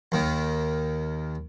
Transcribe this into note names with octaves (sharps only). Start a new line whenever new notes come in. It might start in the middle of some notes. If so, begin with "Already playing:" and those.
D#2 D#3